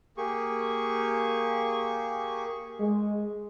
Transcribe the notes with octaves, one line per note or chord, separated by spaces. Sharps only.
A#3 G4 G#4 C#6
G#3